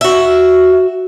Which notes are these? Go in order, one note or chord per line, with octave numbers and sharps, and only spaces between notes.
F#4 E5